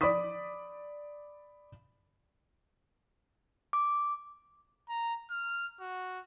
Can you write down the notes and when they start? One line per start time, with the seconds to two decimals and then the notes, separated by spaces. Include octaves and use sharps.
0.01 D5 B5 D6 D#6 B6
3.73 D6
4.89 A#5
5.31 F6
5.80 F#4